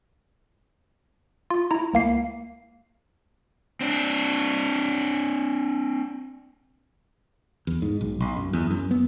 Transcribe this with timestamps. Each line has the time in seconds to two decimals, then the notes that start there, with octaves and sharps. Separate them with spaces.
1.50 F4
1.71 E4 A#5
1.94 C#2 A#3 C7
3.81 C4 D4
7.67 E2
7.82 G#2
8.01 B1
8.20 B1
8.37 F#2
8.53 E2
8.70 F#2
8.91 B3